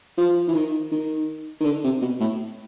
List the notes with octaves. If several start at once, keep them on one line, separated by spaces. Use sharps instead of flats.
F3
E3
D#3
D#3
D#3
D3
C3
B2
A2